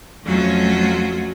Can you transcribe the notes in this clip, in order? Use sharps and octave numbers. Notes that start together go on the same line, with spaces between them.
F2 F#3 A3 C#4 F4 F#4